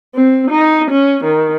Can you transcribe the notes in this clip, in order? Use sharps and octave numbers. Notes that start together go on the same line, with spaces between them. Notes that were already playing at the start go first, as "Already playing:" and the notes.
C4
D#4
C#4
D#3